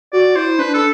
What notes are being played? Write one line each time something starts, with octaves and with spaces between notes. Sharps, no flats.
F#4 D5
E4 C5
D4 B4
A4